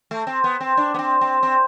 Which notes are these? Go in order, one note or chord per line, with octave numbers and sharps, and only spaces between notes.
A3
C4
B3
C4
D4
B3
C4
C4
C4